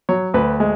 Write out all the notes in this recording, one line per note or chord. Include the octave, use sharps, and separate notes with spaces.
F#3 C#5
D2 B4
G#3